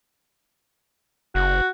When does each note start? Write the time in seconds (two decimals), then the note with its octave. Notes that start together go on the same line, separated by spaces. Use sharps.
1.35 F#1 F#4